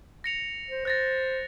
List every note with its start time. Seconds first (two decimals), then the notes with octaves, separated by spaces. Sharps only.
0.24 A#6 C#7 F7
0.70 C5
0.85 C5 F#6 A6 A#6